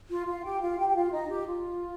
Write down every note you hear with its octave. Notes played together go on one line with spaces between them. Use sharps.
F4
F4 F5
G4 G5
F4 F5
G4 G5
G5
F4 F5
D#4 D#5
G4
F4